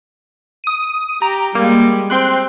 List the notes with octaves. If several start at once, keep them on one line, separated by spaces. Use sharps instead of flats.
D#6 D#7
G4 A#5
G3 G#3 A#3
C4 G5 C6 F#6